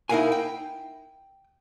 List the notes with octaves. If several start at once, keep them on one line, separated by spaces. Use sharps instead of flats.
D#4 E4 A#4 F5 F#5 G#5
G5